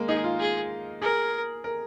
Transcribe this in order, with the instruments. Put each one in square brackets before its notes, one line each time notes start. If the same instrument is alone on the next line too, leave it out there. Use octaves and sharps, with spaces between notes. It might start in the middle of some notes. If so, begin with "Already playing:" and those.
Already playing: [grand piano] G#3 A#3
[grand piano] D#4 [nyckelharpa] G#4
[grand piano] F4
[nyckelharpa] G#4
[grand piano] G#4 [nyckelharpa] A#4
[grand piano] A#4